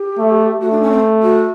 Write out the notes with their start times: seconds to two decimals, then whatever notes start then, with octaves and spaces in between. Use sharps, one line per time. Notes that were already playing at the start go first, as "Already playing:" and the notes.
Already playing: G4
0.19 A3
0.60 A3 F#4
0.71 D4
0.82 C#4
0.91 C4
1.23 F#4